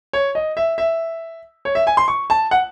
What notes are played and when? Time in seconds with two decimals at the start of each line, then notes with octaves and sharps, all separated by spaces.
0.13 C#5
0.35 D#5
0.57 E5
0.78 E5
1.65 C#5
1.75 E5
1.87 G#5
1.97 C6
2.08 C#6
2.30 A5
2.51 F#5